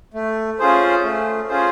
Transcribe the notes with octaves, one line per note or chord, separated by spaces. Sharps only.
A3
C#4 F4 G#4 C5
A3
C#4 F4 G#4 C5